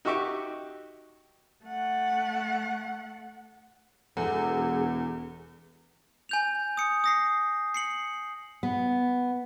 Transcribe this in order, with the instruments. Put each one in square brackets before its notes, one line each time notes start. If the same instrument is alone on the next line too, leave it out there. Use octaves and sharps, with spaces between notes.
[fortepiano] D#4 F#4 G4 E5 C#6 D6
[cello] A3 F#5
[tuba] E1 [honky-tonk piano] E2 [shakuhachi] G#4 [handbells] A4 F#5
[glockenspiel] G#5 G6 F7
D#6 C#7
D#6 A#6 C7
C7 C#7 F#7
[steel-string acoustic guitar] B3